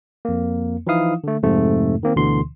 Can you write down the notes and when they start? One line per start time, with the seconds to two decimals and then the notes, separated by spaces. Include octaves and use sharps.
0.25 F2 A#3
0.87 E3 F3 D#4 E4 F5 D#6
1.24 D3 A3
1.43 F2 G#2 C3 A3
2.03 D#3 A#3 C4
2.16 D2 B2 D3 E3 C6